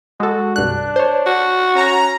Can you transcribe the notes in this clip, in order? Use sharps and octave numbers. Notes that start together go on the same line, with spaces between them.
G#3 F#4 A4
C2 G2 D4 F#6
C5 C#5
F#4
C#4 A#5